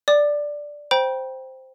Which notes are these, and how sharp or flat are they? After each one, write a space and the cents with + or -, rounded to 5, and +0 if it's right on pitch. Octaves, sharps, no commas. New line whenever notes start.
D5 +0 D6 +30
C5 +0 G5 +0 B5 -45